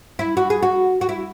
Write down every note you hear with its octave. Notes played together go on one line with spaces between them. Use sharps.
E4
F#4
G#4
F#4
F#4
E4